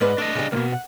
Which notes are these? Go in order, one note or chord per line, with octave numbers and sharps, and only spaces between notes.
G#2 B4 D5 D#5
A3 D4 D#5
C#3 G3
C2 B2 A#3
F#5